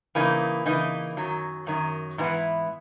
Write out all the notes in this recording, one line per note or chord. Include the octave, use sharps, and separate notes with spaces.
C#3 E3 A#3 D#4
C#3 E3 A#3 D#4
F#2 D#3 F#3
F#2 D#3 F#3
G#2 E3 B3 E4